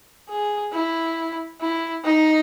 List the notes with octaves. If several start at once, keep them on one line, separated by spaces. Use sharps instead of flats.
G#4
E4
E4
D#4